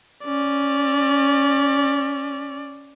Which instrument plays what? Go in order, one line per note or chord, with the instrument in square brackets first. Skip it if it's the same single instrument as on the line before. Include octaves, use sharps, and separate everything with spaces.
[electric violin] C#4 D5